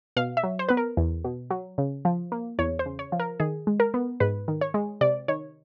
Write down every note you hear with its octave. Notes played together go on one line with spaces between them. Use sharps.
B2 F5
E5
F#3
C5
B3 B4
A#4
E2
B2
F#3
C#3
F3
A#3
E2 C#5
C5
C#3
C#5
F3
A#4
D#3 G#4
G#3
A#4
B3
G#2 B4
D#3
C#5
G#3
C3 D5
D#3 C#5